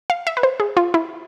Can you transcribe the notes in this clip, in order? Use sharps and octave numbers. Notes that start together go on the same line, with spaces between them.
F5
E5
B4
C5
G#4
F4
E4